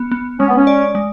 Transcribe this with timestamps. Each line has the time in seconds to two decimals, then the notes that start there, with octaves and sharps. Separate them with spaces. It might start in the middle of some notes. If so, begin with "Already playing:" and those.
Already playing: B3
0.11 B3
0.39 G#3 C#4
0.47 B3
0.56 C#4
0.67 D5
0.95 G#3